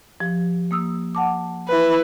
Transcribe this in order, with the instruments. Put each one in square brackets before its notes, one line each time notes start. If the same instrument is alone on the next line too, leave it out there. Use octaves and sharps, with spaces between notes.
[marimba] F3 G4
A#3 D#6 E6
F#5 A5 D6
[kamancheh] E4 B4